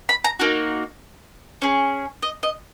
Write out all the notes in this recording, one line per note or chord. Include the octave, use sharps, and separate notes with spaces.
B5
A#5
A#3 D#4 F#4
C#4 G#4
D#5
D#5